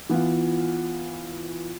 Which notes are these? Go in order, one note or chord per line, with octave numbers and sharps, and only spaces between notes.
E3 B3 E4 F4